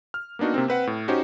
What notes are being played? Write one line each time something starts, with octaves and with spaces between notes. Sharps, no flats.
F6
A#3 B3 D4 D#4 F#4
C3 A#3 C4
C4 B4 F#5
A2
C#4 D#4 F#4 G4 C5